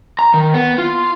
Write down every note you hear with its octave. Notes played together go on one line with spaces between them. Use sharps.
A#5
D#3
B3
F4